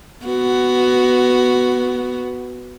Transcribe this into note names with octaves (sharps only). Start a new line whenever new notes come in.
B3 F#4